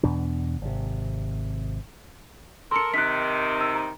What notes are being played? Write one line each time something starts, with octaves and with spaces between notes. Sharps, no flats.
E2 B2 D4
G#1 C3
A4 A#4 C6 C#7
C3 D#3 F#6 B6
E6
A#5